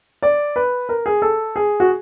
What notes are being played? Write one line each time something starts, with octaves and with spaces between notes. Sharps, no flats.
D5
B4
A#4
G#4
A4
G#4
F#4